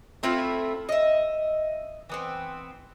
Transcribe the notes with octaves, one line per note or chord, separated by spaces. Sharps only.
A3 C4 E4 F4
D#5 E5
E3 B3 C4